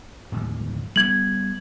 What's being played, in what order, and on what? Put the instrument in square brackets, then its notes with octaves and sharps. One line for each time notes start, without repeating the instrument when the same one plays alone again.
[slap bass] D1 G1 D#2
[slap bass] G3 A3 B3 [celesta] G#6 F#7